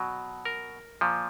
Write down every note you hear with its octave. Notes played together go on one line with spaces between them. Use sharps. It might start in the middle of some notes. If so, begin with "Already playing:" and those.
Already playing: B2 F#3
A#4
A#2 F3